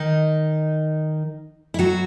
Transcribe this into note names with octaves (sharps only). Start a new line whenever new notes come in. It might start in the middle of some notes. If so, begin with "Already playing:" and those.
Already playing: D#3 D#4
E4
F#3 F#4